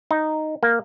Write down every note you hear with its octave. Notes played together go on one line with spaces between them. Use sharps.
D#4
A#3